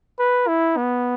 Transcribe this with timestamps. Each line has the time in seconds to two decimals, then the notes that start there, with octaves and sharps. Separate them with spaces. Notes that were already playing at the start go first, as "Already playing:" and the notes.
0.19 B4
0.48 E4
0.77 B3